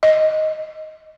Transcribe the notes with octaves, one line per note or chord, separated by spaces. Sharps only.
D#5